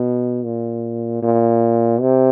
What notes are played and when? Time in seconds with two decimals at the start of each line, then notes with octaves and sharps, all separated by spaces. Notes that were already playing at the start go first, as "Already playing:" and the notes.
Already playing: B2
0.44 A#2
1.23 A#2
2.01 C3